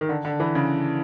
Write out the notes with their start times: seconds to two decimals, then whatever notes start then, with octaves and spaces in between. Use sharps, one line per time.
0.01 D#3
0.09 D3
0.25 D3
0.40 E3
0.55 C#3